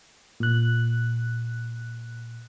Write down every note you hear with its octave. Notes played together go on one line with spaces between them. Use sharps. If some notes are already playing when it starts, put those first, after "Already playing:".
A#2 F#6